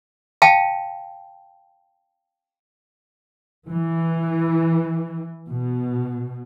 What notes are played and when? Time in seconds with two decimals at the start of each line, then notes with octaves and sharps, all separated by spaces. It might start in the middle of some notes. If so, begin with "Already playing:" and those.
0.42 F5 G5 A5
3.68 E3
5.49 B2